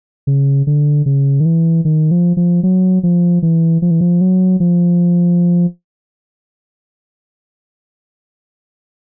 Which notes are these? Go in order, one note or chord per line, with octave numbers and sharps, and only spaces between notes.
C#3
D3
C#3
D#3
E3
D#3
F3
F3
F#3
F3
E3
F3
E3
F3
F#3
F3